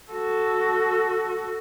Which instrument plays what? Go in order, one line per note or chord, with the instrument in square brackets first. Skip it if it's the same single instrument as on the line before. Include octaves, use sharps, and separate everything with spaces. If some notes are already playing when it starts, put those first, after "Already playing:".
[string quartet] F#4 A4